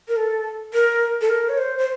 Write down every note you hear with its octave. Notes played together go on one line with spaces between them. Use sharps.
A#4
A4
A#4
A4
A#4
C#5
C5
C5